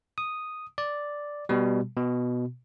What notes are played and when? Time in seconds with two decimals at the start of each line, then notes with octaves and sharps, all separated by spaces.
0.18 D#6
0.78 D5
1.49 B2 G3
1.97 B2